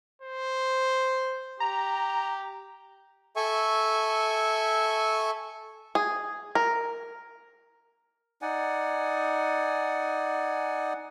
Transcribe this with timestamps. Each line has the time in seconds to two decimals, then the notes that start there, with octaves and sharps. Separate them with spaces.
0.22 C5
1.60 G4 A#5
3.36 A4 E5 G#5 C#6
5.95 G#4
6.55 A#4
8.42 D#4 D5 F#5 G#5